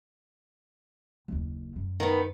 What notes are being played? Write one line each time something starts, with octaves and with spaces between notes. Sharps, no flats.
F#1 D#2
F#2 G3
D#3 B3